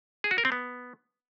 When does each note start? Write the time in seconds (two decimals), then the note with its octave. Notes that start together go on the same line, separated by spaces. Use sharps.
0.24 G#4
0.31 F#4
0.38 A#4
0.45 C4
0.52 B3